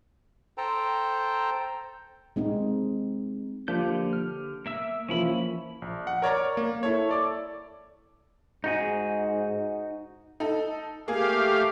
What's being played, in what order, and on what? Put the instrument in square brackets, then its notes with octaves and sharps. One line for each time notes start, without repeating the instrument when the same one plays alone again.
[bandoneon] A4 C5 G5 A5 A#5
[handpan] G#3 C4 D#4
[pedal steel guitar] D3 G4 G6 [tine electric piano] F3 A#3 D4
[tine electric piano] F6
[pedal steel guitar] A#3 E5 E6
[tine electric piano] E3 F3 A#3 [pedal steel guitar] C#4 E4 B5
[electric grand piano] A#1
F#5
A#4 C#5 D5 A#5
A#3
E4 A4 C#5
A4 D5 D6
[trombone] G#2 [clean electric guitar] D#4 F#4 G#4
[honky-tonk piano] D#4 A4
[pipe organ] A3 G4 F5 [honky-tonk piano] A#3 G#4